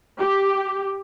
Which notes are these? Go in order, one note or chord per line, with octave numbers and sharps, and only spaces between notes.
G4